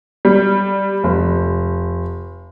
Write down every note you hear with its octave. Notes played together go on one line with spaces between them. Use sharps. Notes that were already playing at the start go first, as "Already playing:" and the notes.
G3
F1